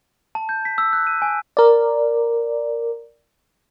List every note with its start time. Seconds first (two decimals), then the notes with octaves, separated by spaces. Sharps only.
0.35 A5
0.49 G6
0.65 B6
0.78 E6
0.93 F#6
1.07 D#7
1.22 G#5
1.57 A#4 D5